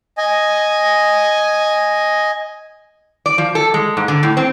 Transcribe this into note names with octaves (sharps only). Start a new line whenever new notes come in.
D#5 G#5
D5
F3
A4
G#3
G#2
D3
A2
C4